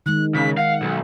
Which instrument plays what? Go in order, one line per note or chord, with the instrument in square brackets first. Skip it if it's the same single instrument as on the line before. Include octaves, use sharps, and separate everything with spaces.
[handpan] D#3 G#3 [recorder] F#6
[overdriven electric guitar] C#3 [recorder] B6
[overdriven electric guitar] F5 [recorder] F#5
[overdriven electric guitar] B1